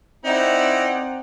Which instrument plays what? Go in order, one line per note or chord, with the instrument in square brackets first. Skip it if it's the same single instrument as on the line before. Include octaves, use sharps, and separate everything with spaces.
[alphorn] C4 [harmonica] D#4 E4 [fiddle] D5 F#5